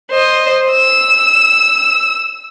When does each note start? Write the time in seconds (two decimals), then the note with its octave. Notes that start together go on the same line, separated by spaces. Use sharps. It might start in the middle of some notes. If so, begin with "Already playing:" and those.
0.11 C5 D#5
0.72 E6